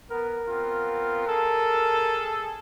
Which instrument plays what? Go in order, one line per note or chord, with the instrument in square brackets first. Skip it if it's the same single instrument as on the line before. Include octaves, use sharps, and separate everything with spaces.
[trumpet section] B3 [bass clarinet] A#4
[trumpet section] B3 C4 F4
G#4 A4